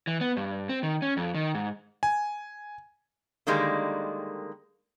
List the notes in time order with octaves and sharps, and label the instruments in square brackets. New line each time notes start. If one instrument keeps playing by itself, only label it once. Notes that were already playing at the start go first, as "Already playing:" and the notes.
[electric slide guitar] E3
B3
G2
C4
D#3
C#4
F2
D#3
G#2
[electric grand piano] G#5
[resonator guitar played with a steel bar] D3 D#3 G3 G#3 A#3